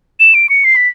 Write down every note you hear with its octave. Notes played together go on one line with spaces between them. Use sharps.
E7
D7
C#7
C7
B6